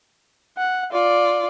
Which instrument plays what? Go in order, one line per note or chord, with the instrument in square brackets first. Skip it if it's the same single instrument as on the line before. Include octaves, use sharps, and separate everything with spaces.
[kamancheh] F#5
F4 D5